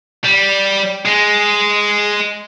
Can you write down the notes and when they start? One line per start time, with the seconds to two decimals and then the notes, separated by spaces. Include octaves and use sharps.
0.24 G3
1.05 G#3